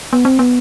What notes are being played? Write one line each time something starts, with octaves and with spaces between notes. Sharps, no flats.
B3
C4
B3